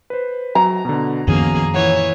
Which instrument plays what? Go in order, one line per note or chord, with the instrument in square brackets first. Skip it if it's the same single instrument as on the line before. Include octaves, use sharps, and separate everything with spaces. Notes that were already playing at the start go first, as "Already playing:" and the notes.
[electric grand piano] B4 C5
[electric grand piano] F#3 [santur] A#5
[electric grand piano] B2 D3
[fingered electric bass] F#2 D#3 F3 [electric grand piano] B2 C#4 [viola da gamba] A#3 G#4
[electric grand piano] A#2 F#5 [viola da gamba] E3 C#5